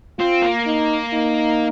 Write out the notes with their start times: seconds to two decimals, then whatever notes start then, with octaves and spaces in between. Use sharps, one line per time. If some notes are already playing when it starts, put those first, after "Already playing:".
0.19 C4 F4
0.42 A#3
0.66 D#4
1.13 D#4